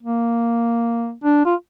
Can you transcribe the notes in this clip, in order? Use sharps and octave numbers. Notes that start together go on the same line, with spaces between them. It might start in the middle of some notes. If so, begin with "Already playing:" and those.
A#3
D4
F4